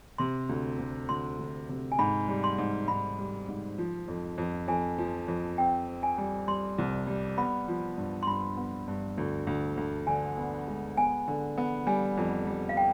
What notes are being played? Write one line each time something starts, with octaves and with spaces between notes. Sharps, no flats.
C3 C6
D2
D2
D2 C6
D2
C3
G#5
G#2 B5
G3
C6
G#2
G#2 B5
G3
G#2
F3
F2
F2
F2 G#5
F3
F2
C4 G5
C4
G#5
G3
G3 C6
C2
G3
B3 B5
F3
G2
C6
G2 B5
B3
G2
D2
D2
D2
D3 G#5
B3
G#3
B3 G#5
D3
B3
G3 G#5
F2
G3
F5
G5